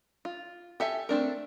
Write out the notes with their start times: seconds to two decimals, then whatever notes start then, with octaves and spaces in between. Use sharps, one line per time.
0.25 F4
0.80 G4 A4 E5 G#5
1.09 A3 C4 D4 A#4